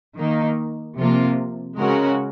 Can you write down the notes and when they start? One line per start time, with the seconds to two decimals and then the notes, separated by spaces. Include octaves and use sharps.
0.17 D#3 A#3 D#4
0.98 C3 F3 A#3 F4
1.78 C#3 G#3 C#4 F#4 A#4